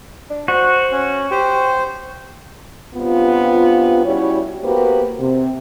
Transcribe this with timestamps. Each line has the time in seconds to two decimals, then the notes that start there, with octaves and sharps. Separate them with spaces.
0.30 D4
0.48 F#4 C5
0.92 C#4
1.31 G4 C5
2.95 G2 C3 B3 F4
4.05 G3 C#4 E4 F#4 C#5
4.64 A#3 B3 F#4 G4 B4 C5
5.19 C3